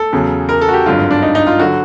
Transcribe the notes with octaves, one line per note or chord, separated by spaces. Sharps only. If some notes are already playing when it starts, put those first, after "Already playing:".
Already playing: A4
E2 C#3 F#3
A#4
A4
F#4
G4
G#1 G2 D3 F#3 F4
D4
D#4
D#4
F4
D3 F#3 F#4